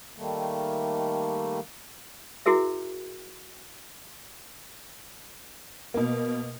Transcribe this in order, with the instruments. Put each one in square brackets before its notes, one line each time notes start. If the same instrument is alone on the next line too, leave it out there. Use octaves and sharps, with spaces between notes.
[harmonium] D#3 G3 A3 A#3
[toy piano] E4 F#4 G#4 A#4 E5
[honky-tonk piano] B2 A#3